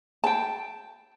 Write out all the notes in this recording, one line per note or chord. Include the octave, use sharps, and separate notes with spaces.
G5 A5